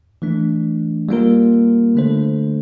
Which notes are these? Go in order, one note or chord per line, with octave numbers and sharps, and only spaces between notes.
E3 A3 D4
G3 A#3 F4 A#4
D3 A3 D4 A4 C5